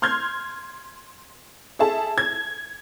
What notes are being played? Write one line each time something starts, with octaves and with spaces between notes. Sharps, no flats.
C6 F6 G6 G#6
G#4 A4 E5 A5
G#6